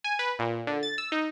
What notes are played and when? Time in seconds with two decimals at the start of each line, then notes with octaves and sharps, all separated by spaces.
0.04 G#5
0.19 B4
0.39 A#2
0.67 D3
0.83 A6
0.98 E6
1.12 D#4